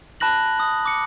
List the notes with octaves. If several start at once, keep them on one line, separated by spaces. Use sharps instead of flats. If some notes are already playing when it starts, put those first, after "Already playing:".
A5 B5 F#6 A#6 F#7
D#6
D6 C#7